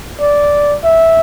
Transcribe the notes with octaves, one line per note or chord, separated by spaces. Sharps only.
D5
E5